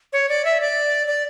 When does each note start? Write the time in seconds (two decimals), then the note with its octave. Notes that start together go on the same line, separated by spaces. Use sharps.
0.13 C#5
0.29 D5
0.45 E5
0.61 D5
1.07 D5